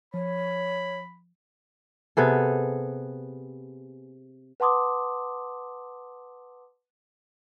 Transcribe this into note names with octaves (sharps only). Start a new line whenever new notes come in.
F3 C#5 B5
C3 B3 G#4 A4
B4 F#5 A5 C6 D6 D#6